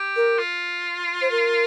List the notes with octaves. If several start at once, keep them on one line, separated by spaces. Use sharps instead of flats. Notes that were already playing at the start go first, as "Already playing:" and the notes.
Already playing: G4
A#4
F4
C5
A#4